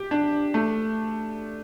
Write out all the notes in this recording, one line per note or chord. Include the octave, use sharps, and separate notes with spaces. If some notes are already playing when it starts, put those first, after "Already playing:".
Already playing: G4
D4
A3